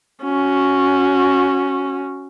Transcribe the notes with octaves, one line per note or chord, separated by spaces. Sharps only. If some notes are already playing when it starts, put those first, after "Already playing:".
C#4 F#4